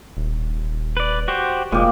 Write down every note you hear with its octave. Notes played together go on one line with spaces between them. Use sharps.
D#1
B4 D5
F#4 G4 C5
F1 A#2 G#3 G4 D#5